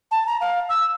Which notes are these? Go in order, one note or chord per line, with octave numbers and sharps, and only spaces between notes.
A5
A#5
F5
E6